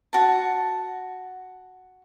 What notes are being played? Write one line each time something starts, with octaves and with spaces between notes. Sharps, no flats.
F#4 A5